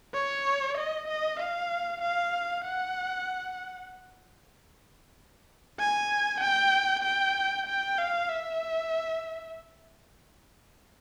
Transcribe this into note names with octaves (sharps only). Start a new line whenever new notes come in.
C#5
D#5
D#5
F5
F5
F#5
G#5
G5
G5
G5
F5
E5